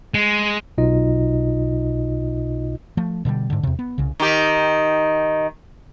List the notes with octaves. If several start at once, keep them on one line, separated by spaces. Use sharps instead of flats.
G#3
B1 B2 D#4 F4 D#5
F3 A3
B2 D3 F#3 G3
G#2 D3
E2 C3
B3
C2 C#3
D#3 G4